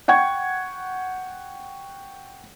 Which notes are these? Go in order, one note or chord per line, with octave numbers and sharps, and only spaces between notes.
F#5 G5 C#6 G#6